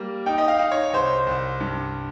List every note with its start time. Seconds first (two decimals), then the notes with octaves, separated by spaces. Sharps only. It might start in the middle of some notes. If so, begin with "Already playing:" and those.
Already playing: G3 A#3
0.26 D#4 G5
0.38 D#5
0.48 F5
0.59 D#4
0.71 C#5
0.93 C2 C5
1.27 C2
1.60 G2